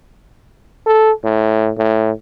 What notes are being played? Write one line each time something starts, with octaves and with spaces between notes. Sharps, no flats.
A4
A2
A2